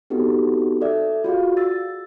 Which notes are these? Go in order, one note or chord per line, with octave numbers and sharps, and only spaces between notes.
B3 C4 D#4 F#4 G4 A4
A4 D5 E5
F4 F#4 G#4 F5
E6 A6